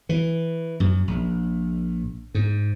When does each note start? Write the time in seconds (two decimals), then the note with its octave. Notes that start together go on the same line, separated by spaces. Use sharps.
0.09 E3
0.80 F#2
1.08 A#1
2.35 G#2